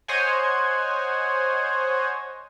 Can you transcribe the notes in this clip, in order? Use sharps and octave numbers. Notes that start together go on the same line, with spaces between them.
C5 C#5 D#5 F#5 G#5